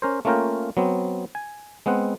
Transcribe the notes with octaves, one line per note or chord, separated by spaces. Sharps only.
C#4 A#4 C5
A3 A#3 C#4 F4 A#4 G5
F#3 B3 C4
G#5
G#3 B3 C4 F#5